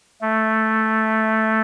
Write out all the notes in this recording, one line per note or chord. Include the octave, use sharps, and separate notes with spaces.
A3